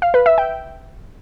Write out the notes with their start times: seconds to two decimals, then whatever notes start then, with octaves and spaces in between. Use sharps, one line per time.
0.02 F5
0.14 B4
0.26 E5
0.38 G5